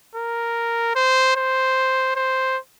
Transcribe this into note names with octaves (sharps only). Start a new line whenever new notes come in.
A#4
C5
C5
C5